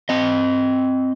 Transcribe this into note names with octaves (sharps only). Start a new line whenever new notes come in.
C4 D#5